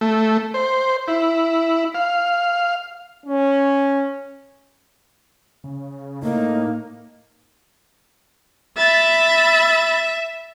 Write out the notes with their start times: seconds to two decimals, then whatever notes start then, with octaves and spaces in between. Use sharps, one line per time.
0.01 A3
0.54 C5
1.08 E4
1.95 F5
3.26 C#4
5.64 C#3
6.23 A2 A#3 D#4
8.78 E5 B5 A6